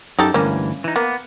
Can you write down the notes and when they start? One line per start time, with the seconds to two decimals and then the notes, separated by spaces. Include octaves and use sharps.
0.19 F#2 D#4 G4 A4
0.34 D2 G2 E3 A#3 C#4
0.84 E3 D#4
0.96 A#3 B3